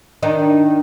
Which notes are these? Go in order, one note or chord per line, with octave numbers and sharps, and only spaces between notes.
D#3 D4 D#4